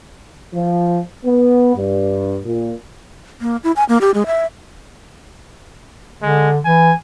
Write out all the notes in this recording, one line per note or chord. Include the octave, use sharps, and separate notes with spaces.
F3
B3
G2
A#2
A#3
E4
G#5
A#3
G4
G#3
E5
D3 G#3
E3 G#5